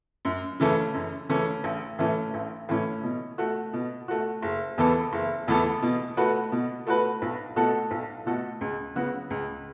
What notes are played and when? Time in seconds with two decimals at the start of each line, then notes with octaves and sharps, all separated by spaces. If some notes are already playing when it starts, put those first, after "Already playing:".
0.25 F#2
0.60 C#3 E3 A3 C#4
0.94 F#2
1.29 C#3 E3 A3 C#4
1.64 A1
1.99 A2 E3 A3 C#4
2.34 A1
2.69 A2 E3 A3 C#4
3.03 B2
3.38 A3 F#4
3.73 B2
4.08 A3 F#4
4.42 F#1
4.78 E2 E3 B3 A4
5.13 F#1
5.48 E2 E3 B3 A4
5.82 B2
6.17 A3 F#4 B4
6.52 B2
6.87 A3 F#4 B4
7.22 B1
7.56 B2 A3 F#4 A4
7.91 B1
8.26 B2 A3 F#4 A4
8.61 C#2
8.95 C#3 F#3 B3 F#4
9.30 C#2